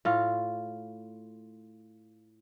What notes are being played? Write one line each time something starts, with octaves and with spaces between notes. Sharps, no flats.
A2 F4